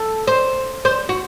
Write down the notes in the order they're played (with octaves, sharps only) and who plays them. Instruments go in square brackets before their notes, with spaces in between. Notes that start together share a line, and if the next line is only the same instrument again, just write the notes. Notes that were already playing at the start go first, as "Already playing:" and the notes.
Already playing: [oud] A4
C5
C5
F#4